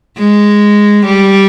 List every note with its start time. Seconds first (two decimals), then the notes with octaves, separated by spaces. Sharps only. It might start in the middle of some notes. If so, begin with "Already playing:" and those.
0.18 G#3
1.06 G3